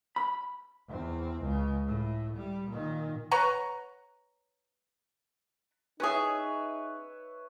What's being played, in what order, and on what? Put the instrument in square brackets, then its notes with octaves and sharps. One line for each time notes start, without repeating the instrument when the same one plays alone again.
[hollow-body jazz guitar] B5
[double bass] E2 C4
C#2 C#3
A2
G3
A#2 D#3
[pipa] B4 C#5 F#5 A#5
[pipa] C#4 G#4 [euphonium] D#4 [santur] B4 C#5 E5